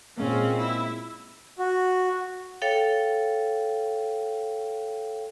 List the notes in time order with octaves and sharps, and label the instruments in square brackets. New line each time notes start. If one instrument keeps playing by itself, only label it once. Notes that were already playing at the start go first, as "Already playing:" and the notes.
[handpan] A#2 G#3 A#3 [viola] C4 C#4
[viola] E4
[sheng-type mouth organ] F#4
[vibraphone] A4 C#5 F5 G5